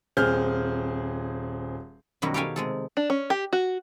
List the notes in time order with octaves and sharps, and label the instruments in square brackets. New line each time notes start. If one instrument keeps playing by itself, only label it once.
[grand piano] D#1 C4 G#4 F6 G6
[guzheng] F#2 B2 D#3 G3 E4 F#4
G4 A4 C#5 F5 G5 G#5
C3 G#3 A4
[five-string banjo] D4
C#4
G4
F#4